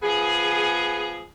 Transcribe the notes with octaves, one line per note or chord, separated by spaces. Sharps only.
F3 B3 G#4